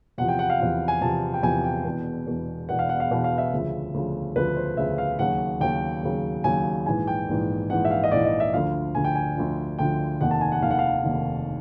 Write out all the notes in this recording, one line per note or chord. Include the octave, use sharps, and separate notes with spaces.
E2 C3 F3 F#5
G5
F#5
F5
E2 C3 F3 F#5
G#5
E2 C3 F3 A5
G5
E2 C3 F3 G#5
G5
E1 E2 B2
E1 E2 B2
E1 E2 B2 F#5
F5
F#5
F5
E1 E2 B2
F5
E5
D2 C#3 F3
D2 C#3 F3
D2 C#3 F3 B4
C5
D2 C#3 F3 E5
F5
D#2 C#3 F#3 F#5
D#2 C#3 F#3 G5
D#2 C#3 F#3
D#2 C#3 F#3 G#5
A#1 G#2 E3 G#5
G5
A#1 G#2 E3
A#1 G#2 E3 F#5
E5
F5
D#5
A#1 G#2 E3 D5
D#5
E5
D2 D3 F3 F5
D2 D3 F3 G#5
G5
G#5
D2 D3 F3
D2 D3 F3 G5
F1 D#2 D#3 F#5
A5
G#5
F#5
F1 D#2 D#3 F5
F#5
F5
F1 D#2 D#3